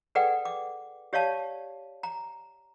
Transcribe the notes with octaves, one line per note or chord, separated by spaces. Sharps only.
G#4 A4 B4 D5 F#5 G5
D6
G4 C#5 D5 F5 A5
A#5